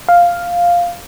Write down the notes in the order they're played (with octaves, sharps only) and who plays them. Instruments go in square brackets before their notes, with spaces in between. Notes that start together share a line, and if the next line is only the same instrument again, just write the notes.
[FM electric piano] F5